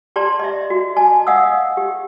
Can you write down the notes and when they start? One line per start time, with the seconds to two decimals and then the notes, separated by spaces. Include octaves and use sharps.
0.16 G4 D5 A5 A#5 C6
0.39 D#5 E5
0.70 F#4
0.97 D#5 G#5 A5
1.27 D#5 F5 F#5 D#6 E6
1.77 G4